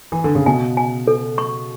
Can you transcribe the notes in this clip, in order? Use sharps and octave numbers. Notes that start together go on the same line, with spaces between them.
E3
D3
C#3
B2 G#5
G#5
A4
C#6